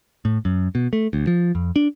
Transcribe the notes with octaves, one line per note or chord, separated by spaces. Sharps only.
A2
F#2
B2
A3
D2
F3
F2
D4